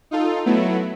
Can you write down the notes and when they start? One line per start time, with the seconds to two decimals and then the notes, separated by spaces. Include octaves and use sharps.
0.11 D#4 F4 A4
0.46 F#3 A3 B3 E4